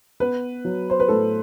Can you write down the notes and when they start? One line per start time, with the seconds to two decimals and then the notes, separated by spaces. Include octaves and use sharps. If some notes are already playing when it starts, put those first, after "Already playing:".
0.20 B3 B4
0.65 F#3
0.90 C5
1.00 B4
1.08 A2 A4